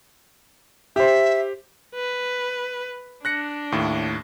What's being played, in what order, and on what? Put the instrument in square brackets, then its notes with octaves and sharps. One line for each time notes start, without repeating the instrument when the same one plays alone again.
[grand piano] G4 C5 [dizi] E5
[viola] B4
[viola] D4 [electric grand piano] F#6 A#6 C#7
[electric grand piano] D#2 A2